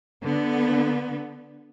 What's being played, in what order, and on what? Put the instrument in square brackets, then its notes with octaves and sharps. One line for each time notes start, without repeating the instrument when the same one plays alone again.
[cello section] D3 B3